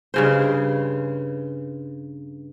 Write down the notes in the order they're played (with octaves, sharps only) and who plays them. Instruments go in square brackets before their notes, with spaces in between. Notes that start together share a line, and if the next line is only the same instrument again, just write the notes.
[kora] G2 C#3 C5